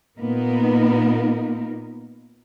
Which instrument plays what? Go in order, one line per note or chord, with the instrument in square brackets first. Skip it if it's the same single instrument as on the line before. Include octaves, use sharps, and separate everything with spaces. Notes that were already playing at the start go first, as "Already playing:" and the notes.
[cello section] A#2 A#3 B3 D#4 A#4